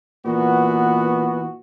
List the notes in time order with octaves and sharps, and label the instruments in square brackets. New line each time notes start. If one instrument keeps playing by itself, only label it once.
[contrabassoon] A#2 [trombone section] E3 B3 F#4